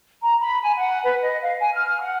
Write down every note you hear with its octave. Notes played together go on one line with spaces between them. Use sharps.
A#5
B5
G#5
F#5
B4
D#5
F5
G#5
F6
F#5